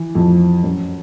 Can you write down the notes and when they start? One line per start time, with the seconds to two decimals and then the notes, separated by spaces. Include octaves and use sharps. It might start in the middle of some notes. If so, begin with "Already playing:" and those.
Already playing: E3
0.15 F2 F3
0.63 F#2 F#3